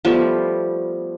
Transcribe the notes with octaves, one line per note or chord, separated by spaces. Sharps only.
F3 G3 A3 B3